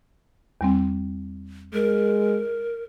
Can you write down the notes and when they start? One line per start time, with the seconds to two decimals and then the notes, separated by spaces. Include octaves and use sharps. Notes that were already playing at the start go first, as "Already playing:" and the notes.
0.61 E2 G3 C4
1.74 G#3 A#4